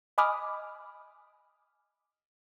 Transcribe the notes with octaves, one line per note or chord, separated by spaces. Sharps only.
D#5 G#5 B5 D6 D#6 F6